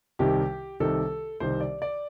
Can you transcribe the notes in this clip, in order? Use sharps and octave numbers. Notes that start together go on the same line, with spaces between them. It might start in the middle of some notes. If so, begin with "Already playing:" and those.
C2 C3 D#3 G4
C2 C3 D#3 A4
C2 C3 D#3 C5
D5
D5